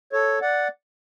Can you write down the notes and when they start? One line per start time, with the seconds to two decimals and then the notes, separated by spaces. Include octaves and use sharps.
0.13 A4 C#5
0.42 D5 F#5